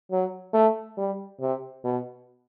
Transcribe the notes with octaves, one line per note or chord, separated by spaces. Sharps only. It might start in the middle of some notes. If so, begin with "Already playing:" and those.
F#3
A3
G3
C3
B2